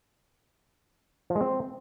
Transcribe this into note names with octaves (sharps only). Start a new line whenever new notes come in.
F3
G#3
C4